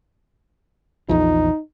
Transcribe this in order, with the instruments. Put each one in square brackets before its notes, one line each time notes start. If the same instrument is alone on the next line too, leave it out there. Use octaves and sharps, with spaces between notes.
[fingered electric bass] A#1 E2 F3 [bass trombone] D#4